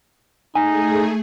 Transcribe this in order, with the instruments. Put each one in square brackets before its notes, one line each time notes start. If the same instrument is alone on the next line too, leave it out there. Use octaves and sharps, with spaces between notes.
[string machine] A3 G#4 [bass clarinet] D#4 [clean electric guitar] G#5